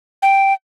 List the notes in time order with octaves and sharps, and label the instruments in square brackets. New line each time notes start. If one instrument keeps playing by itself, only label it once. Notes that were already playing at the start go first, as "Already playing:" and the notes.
[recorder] G5